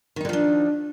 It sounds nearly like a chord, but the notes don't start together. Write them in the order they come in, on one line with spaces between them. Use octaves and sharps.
D#3 D#4 D3 F3 D4